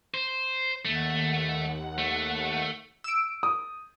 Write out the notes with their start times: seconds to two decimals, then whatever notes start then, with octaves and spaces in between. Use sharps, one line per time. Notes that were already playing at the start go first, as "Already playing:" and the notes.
0.14 C5
0.85 D#2 A3 F#5
1.98 A3
3.04 E6 D7
3.43 D#6